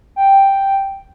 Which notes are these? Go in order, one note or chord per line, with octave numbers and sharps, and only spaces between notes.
G5